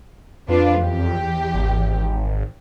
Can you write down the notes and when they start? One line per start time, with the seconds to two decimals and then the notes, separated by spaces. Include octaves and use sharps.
0.49 F2 D4 F4 B4
0.80 E2 G4
1.54 G#1